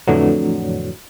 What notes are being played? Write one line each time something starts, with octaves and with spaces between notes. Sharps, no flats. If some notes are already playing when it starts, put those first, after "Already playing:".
F2 A2 D3 E3 F#3